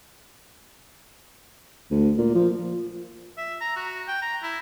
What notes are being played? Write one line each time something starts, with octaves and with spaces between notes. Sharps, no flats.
D2
A#2
F3
E5
A#5
F#4
G5
A#5
E4